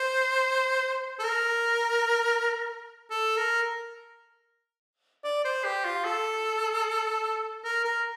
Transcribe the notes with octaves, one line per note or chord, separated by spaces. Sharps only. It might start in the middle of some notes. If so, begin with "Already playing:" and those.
Already playing: C5
A4
A#4
A4
A#4
D5
C5
G4
F4
A4
A#4
A#4